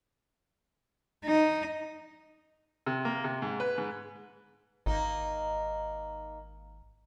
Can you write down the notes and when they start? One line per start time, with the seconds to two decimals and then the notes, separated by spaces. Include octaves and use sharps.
1.25 D#4
2.86 C3
3.05 A#3
3.24 C3
3.42 G#2
3.60 B4
3.78 G#2
4.86 G#1 A#3 D#4